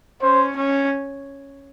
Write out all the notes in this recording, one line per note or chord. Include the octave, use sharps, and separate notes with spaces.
C#4 C5
C#4